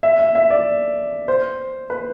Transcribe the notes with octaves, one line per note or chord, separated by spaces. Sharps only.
E5
E5
E5
D5
C5
B4